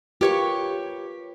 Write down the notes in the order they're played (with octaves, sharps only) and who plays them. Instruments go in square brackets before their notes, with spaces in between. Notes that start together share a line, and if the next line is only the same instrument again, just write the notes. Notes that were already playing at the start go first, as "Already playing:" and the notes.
[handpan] F4 A#4 B4 [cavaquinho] G4 C#5 C#6